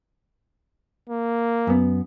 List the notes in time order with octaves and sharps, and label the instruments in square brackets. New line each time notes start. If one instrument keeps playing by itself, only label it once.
[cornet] A#3
[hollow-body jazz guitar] F#2 B3